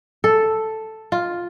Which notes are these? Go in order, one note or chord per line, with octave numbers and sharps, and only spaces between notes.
A4
F4